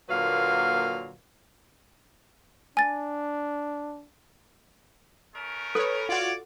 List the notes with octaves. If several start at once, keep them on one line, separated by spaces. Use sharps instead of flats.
A#2 D3 F#3 A#3 B4 F5
D4 G#5 A6
A3 C#4 A#4
A4 B4 C#5
F4 F#4 C#5 D5